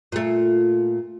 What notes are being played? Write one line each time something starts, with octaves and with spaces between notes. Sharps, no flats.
A#2 A3